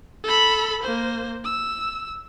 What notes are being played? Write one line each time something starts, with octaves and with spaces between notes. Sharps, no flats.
A4 B5
A#3 C5
E6